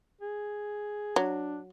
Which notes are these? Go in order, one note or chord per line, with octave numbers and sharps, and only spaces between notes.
G#4
F#3 D4